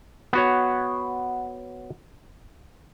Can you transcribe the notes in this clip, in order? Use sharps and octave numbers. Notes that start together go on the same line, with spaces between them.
B3 F#4 C#5